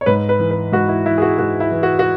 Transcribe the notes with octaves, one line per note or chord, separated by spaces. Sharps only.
C#5
G#2 B4
B4
E3
B4
G#2 F#4
E4
E3 E4
G#4
F#4
G#2 F#4
E4
E3
F#4
F#4